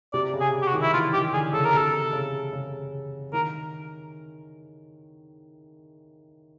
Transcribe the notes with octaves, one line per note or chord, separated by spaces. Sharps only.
C3 D5
C#3
G#4
G4
F#4
D#3
E4
E3 F4
D#3 G4
D3 G#4
C#3 A4
A#4
C3 A4
C#3
C#3
D#3 A#4